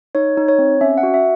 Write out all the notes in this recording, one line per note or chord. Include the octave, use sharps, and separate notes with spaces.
D#4 C#5
D#4
C#5
C4
C#4 E5
F#5
F#4
E5